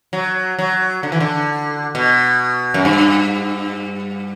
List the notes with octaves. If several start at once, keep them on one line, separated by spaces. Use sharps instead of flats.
F#3
F#3
D3
E3
D3
B2
F#2
G2